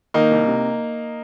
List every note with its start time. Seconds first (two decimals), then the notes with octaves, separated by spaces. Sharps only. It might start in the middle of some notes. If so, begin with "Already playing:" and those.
0.14 D#3 A#3 D#4
0.31 C2
0.48 C3